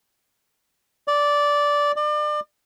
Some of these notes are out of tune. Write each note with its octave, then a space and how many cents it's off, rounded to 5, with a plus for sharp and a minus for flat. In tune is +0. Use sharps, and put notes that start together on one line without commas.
D5 -10
D5 +35